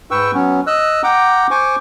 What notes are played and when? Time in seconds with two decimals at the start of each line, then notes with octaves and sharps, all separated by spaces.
0.11 G#2 B4 G5 C#6 E6
0.34 F#3 B3 C#4
0.67 D#5 E6 F#6
1.03 F#5 G5 A#5 D6
1.51 C5 G#5 C#6 D6